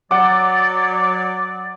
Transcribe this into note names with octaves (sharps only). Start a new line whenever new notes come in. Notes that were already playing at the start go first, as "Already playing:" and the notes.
F#3 D5 F#5 D6